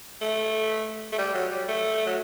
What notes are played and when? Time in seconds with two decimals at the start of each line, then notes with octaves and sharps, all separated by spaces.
0.22 A3
1.12 A3
1.18 G3
1.35 F#3
1.51 G3
1.68 A3
2.06 F#3